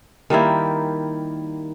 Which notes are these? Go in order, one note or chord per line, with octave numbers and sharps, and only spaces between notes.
D#3 G3 A#3 E4